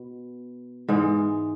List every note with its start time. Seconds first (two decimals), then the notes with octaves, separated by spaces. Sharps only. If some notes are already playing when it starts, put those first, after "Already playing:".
Already playing: B2
0.89 G#2 E3 G#3